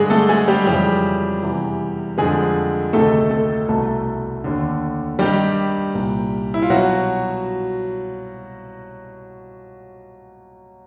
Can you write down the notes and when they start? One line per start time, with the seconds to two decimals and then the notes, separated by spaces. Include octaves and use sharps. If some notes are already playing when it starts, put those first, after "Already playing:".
Already playing: G2 D3 G#3 G#4
0.10 A3 A4
0.29 G#3 G#4
0.48 G3 G4
0.67 F2 C#3 E3 G3 G4
1.43 E2 C3 E3
2.18 F2 D3 G#3 G#4
2.93 D2 C3 D#3 A3 A4
3.30 A3 A4
3.69 C2 B2 A3 A4
4.44 D#2 D3
5.19 G2 D#3 G3 G4
5.94 C2 A#2
6.54 E4
6.62 F4
6.70 B2 F#3 F#4